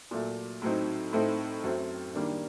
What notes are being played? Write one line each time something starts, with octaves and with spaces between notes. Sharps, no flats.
A#2 F#3 A3
A2 F#3 C4 D#4
A2 A3 C4 D#4
F#2 F#3 A3 C4
D#3 G3 A#3 D4